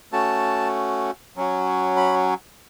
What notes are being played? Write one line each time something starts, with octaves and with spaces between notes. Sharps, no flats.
A3 C#4 F#4 A5
F#3 C#4 F#4
B5